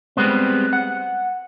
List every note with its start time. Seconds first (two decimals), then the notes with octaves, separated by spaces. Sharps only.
0.17 G3 G#3 B3 C4
0.73 F#5